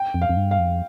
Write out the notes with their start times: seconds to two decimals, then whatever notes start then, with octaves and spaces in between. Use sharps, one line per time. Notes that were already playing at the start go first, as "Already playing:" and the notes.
Already playing: G5
0.14 F2
0.22 F5
0.29 F2
0.37 G2
0.51 F5
0.59 F2